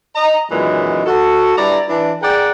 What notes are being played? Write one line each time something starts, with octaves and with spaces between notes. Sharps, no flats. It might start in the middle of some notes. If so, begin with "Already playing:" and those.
D#5 A#5
F#2 A#2 D#3 E3 F#3 G#3
F#4 A4
G2 E4 D5 A#5
E3 D4
G#4 A#4 D5 F#5 G5